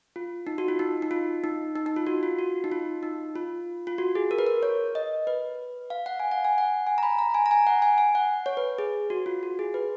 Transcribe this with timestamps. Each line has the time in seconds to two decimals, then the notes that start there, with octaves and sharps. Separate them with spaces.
0.16 F4
0.47 D#4
0.58 F#4
0.68 F4
0.79 D#4
1.02 D#4
1.11 F4
1.44 D#4
1.76 D#4
1.86 D#4
1.96 F4
2.07 F#4
2.23 F4
2.39 F#4
2.64 D#4
2.72 F4
3.03 D#4
3.36 F4
3.87 F4
3.98 F#4
4.15 G#4
4.31 A#4
4.39 B4
4.47 A#4
4.63 C#5
4.95 D#5
5.27 B4
5.90 F5
6.06 F#5
6.20 G#5
6.31 F#5
6.45 G#5
6.58 F#5
6.87 G#5
6.98 A#5
7.03 B5
7.19 A#5
7.34 G#5
7.46 A#5
7.51 G#5
7.67 F#5
7.82 G#5
7.98 G#5
8.15 F#5
8.46 C#5
8.57 B4
8.78 G#4
9.10 F#4
9.26 F4
9.43 F#4
9.59 G#4
9.74 B4